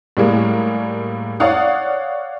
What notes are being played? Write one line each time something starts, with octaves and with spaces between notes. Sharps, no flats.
A2 G3 G#3 A#3
C#5 D5 F5 F#5 D#6